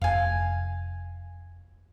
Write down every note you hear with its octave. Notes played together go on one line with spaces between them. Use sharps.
F1 F5 G#5